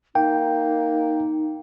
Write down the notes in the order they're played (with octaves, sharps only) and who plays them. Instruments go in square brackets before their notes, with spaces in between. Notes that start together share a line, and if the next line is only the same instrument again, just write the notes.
[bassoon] A#3 [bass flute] D#4 [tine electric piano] G5